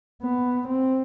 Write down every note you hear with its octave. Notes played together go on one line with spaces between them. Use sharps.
B3
C4